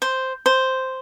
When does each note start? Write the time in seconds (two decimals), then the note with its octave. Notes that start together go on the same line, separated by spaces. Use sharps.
0.02 C5
0.46 C5